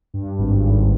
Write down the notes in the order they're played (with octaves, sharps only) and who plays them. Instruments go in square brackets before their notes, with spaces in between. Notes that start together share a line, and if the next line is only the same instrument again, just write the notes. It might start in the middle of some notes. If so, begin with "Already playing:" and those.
[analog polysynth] G2
G#1
G#1